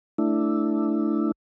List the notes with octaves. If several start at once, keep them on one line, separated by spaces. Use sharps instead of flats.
A3 D4 E4